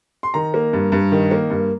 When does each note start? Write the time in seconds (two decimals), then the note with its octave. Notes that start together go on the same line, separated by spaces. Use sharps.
0.23 C6
0.34 D#3 A#5
0.54 A#3
0.73 G2
0.92 G2
1.12 D#3
1.31 A#3
1.50 G2